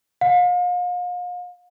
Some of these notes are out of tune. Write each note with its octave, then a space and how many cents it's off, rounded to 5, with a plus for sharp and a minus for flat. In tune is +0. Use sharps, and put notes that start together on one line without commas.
F5 +40